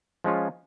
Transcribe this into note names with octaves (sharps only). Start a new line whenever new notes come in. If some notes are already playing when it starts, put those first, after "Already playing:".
F3 G#3 C#4 F4